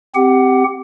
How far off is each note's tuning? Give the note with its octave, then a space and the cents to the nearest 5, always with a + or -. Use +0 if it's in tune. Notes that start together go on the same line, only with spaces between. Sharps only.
C4 -10 G4 +0 F#5 +20